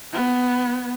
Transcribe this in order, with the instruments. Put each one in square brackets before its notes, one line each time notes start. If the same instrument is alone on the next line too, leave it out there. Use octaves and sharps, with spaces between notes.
[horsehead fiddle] B3